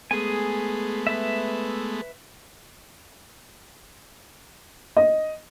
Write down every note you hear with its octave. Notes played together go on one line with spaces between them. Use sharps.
G#3 A3 B3 G#4 G#5
B4 E5
D#5